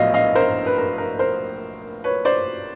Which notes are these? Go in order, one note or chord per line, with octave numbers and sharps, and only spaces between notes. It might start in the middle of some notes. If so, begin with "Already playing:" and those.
Already playing: A#1 A2 F#3 B3 D#5 F5
D#5 F5
A#4 C5
B4
A#4
A#4
A#4 C5
B4 C#5
C5 D5